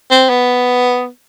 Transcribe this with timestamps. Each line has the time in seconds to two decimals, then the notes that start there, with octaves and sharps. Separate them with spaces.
0.11 C4
0.30 B3